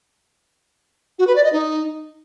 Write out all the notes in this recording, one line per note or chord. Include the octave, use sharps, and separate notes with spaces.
F#4
B4
D5
D#5
D#4